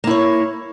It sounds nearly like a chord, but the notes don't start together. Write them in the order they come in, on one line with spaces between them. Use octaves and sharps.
A#3 E4 C#5